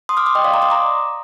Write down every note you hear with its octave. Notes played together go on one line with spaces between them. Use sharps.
C6 D#6
D6 F6
C6 D#6
D#5 G5
D5 F5
A#5 D6
C6 D#6
A#5 D6